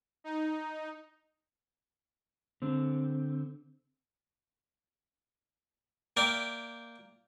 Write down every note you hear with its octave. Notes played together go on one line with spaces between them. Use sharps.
D#4
D3 C4
A#3 A#4 D5 E5 G5